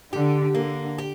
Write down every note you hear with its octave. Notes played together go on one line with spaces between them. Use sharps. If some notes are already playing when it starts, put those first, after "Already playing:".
D3 G4
D3 A#3
G4